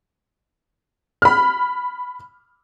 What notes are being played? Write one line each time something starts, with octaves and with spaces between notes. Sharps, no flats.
B5 F6